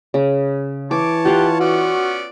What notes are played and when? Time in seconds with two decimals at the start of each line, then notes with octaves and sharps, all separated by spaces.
0.14 C#3
0.91 E3 C#5 A5 D6
1.25 F4 G4 F5 F#5
1.60 B3 C#4 F#4 D5